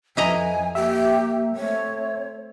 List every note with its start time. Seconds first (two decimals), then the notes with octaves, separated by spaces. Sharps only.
0.17 F2 E4 D#5 G#5 A#5
0.75 A#3 G4 E5
1.56 A3 C4 C#5